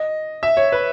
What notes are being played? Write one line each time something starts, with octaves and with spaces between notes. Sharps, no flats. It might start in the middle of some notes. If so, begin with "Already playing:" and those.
Already playing: D#5
E5
C#5
B4